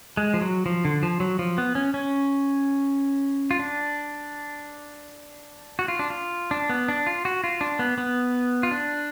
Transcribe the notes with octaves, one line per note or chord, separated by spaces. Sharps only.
G#3
F3
F#3
F3
D3
F3
F#3
F3
B3
C#4
C#4
F4
D4
F#4
F4
D4
F4
D4
B3
D4
F4
F#4
F4
D4
B3
B3
F4
D4